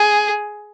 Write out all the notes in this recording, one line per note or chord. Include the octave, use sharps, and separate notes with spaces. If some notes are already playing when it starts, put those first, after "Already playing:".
Already playing: G#4